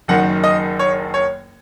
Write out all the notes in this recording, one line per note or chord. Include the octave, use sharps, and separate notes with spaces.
F#1 F#2 D#3 F#5
D#5
C#5
C#5